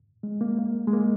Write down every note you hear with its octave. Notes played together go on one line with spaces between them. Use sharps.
G#3
A#3
A#3
G#3
A#3